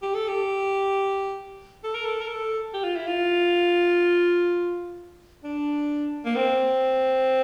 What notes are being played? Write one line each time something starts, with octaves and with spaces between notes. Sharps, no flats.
G4
A4
G4
A4
A#4
A4
A#4
A4
G4
F4
E4
F4
D4
A#3
C4